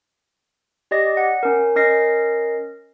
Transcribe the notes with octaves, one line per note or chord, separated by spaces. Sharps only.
G4 D5 D#5 A#6
F#5
C#4 A#4
C#4 A#4 D#5 A#6 C7